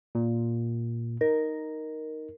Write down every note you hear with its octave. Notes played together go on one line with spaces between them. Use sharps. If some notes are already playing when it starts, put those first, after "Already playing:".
A#2
D#4 A#4